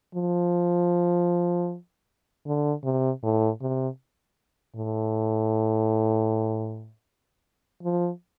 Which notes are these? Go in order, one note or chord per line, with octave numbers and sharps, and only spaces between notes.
F3
D3
C3
A2
C3
A2
F3